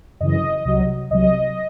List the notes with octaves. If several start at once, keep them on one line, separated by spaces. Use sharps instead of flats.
F#2 C#3 E3 D#5
C2 C3 F#3
C2 C3 F#3 D#5